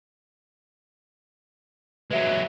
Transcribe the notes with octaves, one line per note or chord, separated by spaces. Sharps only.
F#3 G#3 B4 E5